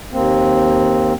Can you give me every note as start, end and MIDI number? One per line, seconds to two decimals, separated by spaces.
0.12 1.13 39
0.12 1.13 58
0.12 1.13 60